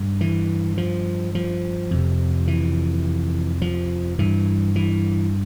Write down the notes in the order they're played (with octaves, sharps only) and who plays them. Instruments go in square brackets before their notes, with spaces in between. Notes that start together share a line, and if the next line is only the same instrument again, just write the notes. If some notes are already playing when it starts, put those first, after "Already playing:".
Already playing: [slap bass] G2
E3
F3
F3
F2 C3
E3
F3
G2 E3
E3